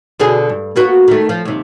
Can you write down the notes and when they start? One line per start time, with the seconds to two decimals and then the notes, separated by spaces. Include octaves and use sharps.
0.20 B2 D3 G#4
0.49 G2
0.76 A#3 B3 F#4
1.08 D#3 A3
1.29 F3
1.45 D#2 C3